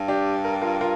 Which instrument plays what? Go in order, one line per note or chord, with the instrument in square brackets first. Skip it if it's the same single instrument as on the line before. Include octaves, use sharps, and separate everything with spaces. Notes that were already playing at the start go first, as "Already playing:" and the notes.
Already playing: [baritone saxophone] G2
[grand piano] D4 G4
A#4
F4 A#4
F4 A#4